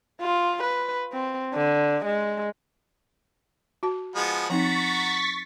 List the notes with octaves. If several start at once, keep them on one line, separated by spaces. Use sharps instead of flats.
F4
B4
C4
D3
G#3
F#4 A5
F3 G#3 B3
F3 C4 D#4 F#4 A#5 C#6 A6 B6